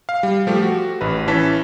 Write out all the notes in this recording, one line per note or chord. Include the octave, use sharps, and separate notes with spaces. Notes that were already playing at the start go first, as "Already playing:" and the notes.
F5
G3
F3 A3 G4
F#4
A1 B4
E3 C#4 A5 B6